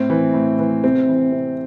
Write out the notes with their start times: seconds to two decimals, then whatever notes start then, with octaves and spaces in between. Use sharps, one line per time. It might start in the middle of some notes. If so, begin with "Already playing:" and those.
Already playing: A2 C4
0.10 E3
0.34 A2
0.59 E3
0.84 C3 C4
1.08 E3
1.32 C3